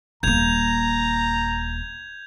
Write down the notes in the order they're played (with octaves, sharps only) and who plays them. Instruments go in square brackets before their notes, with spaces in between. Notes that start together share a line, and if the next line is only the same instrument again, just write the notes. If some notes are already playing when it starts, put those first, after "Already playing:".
[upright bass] D#1 A#3 [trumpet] A#5 [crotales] G6 G#6 F7